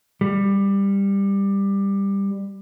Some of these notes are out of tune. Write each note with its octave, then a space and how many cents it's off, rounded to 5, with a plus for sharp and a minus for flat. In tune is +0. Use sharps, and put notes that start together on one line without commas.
G3 +15